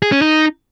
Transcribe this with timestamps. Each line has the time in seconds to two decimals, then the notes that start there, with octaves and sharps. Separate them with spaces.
0.02 G#4
0.12 C#4
0.22 D#4